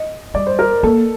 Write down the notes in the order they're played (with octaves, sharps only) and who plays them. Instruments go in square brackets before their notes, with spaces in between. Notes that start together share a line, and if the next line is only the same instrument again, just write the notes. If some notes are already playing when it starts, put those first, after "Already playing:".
Already playing: [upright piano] D#5
[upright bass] G3 [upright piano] D5
[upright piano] C5
A#4
[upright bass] A#3 [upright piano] A4